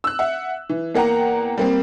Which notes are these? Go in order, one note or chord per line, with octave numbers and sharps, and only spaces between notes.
E6 F#6
E5 F#5
E3
E2 A#3 F#5 G5 A#5
G3 A#3 C4